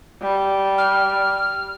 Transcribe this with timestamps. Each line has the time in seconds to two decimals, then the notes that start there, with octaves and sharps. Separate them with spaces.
0.23 G3
0.78 F6